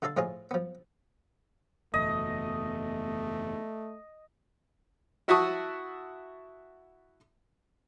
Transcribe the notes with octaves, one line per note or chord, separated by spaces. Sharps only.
D3 F4 A4 D5 C6
A2 F3 G#3 F4 G#4
F3 B3
F#1 E2 B2 A3 D#5
E4 F#4 E5 A5 C#6 D#6